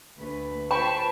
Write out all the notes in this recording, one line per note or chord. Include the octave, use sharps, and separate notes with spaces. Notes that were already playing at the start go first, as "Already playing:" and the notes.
D2 A3 B4
F4 B4 C5 G5 A5 B5 C#6